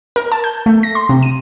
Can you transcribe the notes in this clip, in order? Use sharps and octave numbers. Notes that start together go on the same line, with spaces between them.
A#4
A5
G6
A3
A#6
C6
C3
D#7